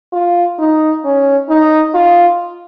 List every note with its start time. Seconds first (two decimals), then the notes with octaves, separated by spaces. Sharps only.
0.13 F4
0.59 D#4
1.04 C#4
1.49 D#4
1.94 F4